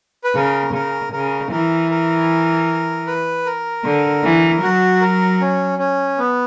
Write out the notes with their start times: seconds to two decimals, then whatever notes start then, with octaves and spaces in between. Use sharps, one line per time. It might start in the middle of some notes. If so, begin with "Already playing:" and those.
0.24 B4
0.35 C#3 A#4
0.74 C#3 A#4
1.12 C#3 A#4
1.51 E3 A#4
1.91 A#4
3.07 B4
3.46 A#4
3.84 D3
4.23 E3
4.62 F#3 F#4
5.01 A#4
5.40 C#4
5.79 C#4
6.18 B3